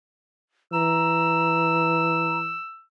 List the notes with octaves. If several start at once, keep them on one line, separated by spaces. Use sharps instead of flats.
E3 A#5 E6